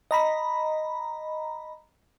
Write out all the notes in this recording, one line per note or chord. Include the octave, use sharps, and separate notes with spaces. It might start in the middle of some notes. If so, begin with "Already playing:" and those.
D#5 A#5 B5